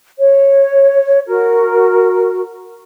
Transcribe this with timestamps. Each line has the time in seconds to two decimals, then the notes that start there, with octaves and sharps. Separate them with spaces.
0.18 C#5
1.26 F#4 A#4